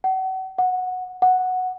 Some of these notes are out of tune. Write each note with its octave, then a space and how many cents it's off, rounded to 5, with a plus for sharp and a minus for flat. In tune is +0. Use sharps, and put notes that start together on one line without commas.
F#5 +35
F#5 -10
F#5 -5